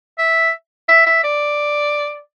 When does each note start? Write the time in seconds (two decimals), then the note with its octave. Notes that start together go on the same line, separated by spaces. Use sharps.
0.18 E5
0.89 E5
1.06 E5
1.24 D5